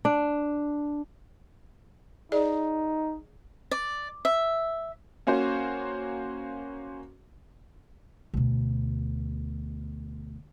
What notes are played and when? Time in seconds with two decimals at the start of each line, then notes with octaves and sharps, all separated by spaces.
0.05 D4
2.32 D#4 G#4 D5
3.71 D5
4.25 E5
5.27 A#3 C#4 F#4 C5
8.34 D2 B2